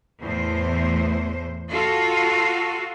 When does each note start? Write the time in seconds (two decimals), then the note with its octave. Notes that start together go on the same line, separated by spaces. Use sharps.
0.21 E2 A2 C5
1.70 F4 F#4 A4